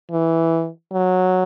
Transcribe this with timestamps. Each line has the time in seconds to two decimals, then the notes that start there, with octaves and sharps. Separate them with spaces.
0.12 E3
0.93 F#3